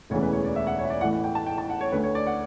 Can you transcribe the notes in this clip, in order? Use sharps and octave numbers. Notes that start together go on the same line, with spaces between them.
E1 D2 C#3 E3 C#5
B4
C#5
D5
E5
F#5
C#5
E5
D5
A1 A2 E3 F#5
F#5
G5
A5
G5
A5
F#5
C#5
D2 D3 B4
C#5
D5
F#5